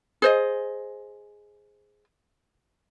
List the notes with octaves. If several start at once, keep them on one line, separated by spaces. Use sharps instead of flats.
G#4 C5 D#5